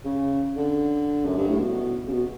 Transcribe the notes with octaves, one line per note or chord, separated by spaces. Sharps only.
C#3
D3
F#2
G2
A2
B2
C#3
B2